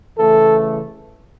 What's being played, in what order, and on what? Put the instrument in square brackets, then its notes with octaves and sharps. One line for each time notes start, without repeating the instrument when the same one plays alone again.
[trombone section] C#3 E3 A3 A4